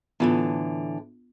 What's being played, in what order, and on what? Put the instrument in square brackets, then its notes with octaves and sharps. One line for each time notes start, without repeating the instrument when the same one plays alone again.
[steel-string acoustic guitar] A2 D3 E3 [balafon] B3 F4 B5